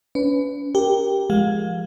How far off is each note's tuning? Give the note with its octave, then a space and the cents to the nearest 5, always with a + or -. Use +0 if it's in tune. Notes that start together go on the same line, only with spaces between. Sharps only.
C#4 +35 B4 +20
G4 +0 A#4 +0
F3 -20 G#3 +0 F5 +30